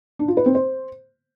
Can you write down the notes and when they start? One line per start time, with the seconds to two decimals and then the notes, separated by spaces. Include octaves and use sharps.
0.19 D4
0.28 F4
0.37 B4
0.46 C4
0.55 C5